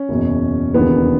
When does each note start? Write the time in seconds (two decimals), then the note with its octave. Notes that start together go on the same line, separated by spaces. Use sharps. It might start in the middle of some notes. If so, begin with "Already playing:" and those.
Already playing: C#4
0.09 F#1 E2 B2
0.74 E1 D#2 C#3 E3 B3